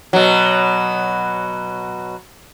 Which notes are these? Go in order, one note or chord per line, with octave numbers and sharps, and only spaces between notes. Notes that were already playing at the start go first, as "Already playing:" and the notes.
B2 F#3